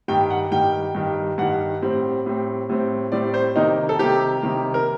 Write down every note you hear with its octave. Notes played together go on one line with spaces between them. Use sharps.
G2 D#3 G3 G5
F#5
G2 D#3 G3 G5
G2 D#3 G3
G2 D#3 G3 F#5
A2 G3 C4
A2 G3 C4
A2 G3 C4
A2 G3 C4 D5
C5
C3 D#3 G3 A#3 D#4
A4
C3 D#3 G3 A#3 G4
C3 D#3 G3 A#3
A#4